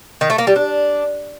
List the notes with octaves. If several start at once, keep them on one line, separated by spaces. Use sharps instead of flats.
D#3
A3
A#3
G3
D4